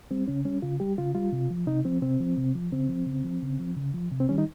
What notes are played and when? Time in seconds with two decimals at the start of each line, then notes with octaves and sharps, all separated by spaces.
0.11 G3 C4
0.28 C#3 C#4
0.45 G3 C#4
0.62 C#3 F4
0.80 G3 G4
0.98 C#3 F4
1.15 G3 F4
1.32 C3
1.51 F3
1.67 C3 D#4
1.85 F3 C4
2.02 C3 C4
2.20 F3
2.38 C3
2.55 F3
2.72 C#3 C4
2.89 F3
3.07 C#3
3.24 F3
3.42 C#3
3.60 F3
3.76 C#3
3.94 F3
4.12 C3
4.20 C4
4.29 D#3 G3 C#4
4.38 D#4